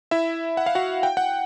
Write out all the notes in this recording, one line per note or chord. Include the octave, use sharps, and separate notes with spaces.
E4 E5
F#5
F5
F#4 F#5
G5
F#5